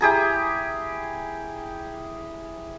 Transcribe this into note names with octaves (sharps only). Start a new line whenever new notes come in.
E4 G4 G#4 A#5